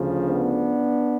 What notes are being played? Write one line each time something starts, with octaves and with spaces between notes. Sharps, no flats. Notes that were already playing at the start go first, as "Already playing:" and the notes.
Already playing: D2 C#3 F3
B3 D4